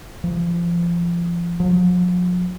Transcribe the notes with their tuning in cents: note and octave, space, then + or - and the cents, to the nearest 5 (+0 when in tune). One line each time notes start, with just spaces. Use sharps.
F3 -25
F3 +45